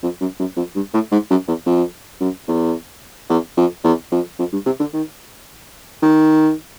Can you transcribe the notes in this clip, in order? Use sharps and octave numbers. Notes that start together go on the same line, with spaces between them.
F2
F#2
F#2
F2
G2
A2
G#2
F#2
E2
F2
F#2
E2
E2
F2
E2
F2
F2
G2
C3
D3
D#3
D#3